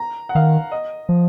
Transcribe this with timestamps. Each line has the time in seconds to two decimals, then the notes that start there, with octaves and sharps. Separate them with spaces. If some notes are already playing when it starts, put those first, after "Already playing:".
Already playing: A#5
0.29 F#5
0.35 D#3 F5
0.72 D#5
1.09 F3